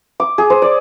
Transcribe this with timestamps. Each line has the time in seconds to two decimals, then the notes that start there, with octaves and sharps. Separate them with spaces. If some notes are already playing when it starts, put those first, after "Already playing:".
0.20 D6
0.38 G#4
0.50 C5
0.62 D5